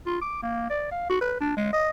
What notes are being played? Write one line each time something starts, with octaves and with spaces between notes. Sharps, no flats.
F4
D6
A#3
D5
F5
F#4
B4
D4
G#3
D#5